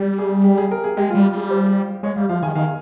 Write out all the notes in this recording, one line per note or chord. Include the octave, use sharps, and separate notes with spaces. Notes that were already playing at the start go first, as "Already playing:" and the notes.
Already playing: G3
G#4
G4
G#4
A#4
G#4
G#3 G4
F4
G3
F4
G3 G#4
C5
G#3 C#5
G3 F5
F3 F5
D#3 G#5
D#3 F5